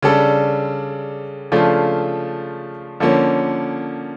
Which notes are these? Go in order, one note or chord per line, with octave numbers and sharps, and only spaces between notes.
C#3 G3 D4 A4
C#3 F3 A3 D4 F4
D3 F3 A#3 C#4